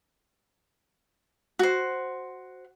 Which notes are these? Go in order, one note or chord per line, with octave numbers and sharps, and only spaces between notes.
F#4 C5